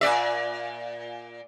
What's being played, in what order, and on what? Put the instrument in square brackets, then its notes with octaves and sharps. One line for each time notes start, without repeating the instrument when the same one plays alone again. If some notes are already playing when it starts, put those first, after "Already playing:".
[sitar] A#2 D5 E5